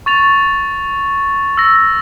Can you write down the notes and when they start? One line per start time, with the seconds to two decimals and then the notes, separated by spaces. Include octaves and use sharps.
0.06 C#6 A6 F7
1.57 E6 A#6